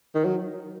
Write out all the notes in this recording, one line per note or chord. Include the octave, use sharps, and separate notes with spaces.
D#3
F#3